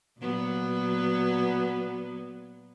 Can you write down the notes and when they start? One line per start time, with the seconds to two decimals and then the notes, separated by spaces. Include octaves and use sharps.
0.20 A#2 F#3 B3